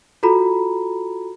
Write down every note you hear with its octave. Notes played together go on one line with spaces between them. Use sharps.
F4 F#4 A4 A#5 B5